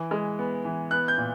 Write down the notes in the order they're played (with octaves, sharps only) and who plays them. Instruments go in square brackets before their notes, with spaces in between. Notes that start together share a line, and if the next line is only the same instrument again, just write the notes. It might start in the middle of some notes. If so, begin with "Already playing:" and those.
Already playing: [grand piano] E3
G#3
B3
E3
B3 F#6
G6
A#2